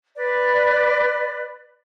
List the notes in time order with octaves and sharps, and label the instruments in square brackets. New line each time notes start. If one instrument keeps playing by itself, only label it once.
[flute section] B4 D5